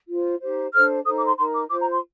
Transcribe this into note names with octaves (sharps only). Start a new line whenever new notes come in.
F4 C5
D#4 G4 C5
D4 A4 C5 F6
D#4 A4 C5 D#6
D6
C6
D#4 A#4 C6
D6
F4 C5 D6
A#5
C6